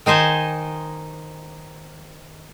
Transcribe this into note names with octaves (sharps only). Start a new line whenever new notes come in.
D#3 D#4 C5 G#5 A5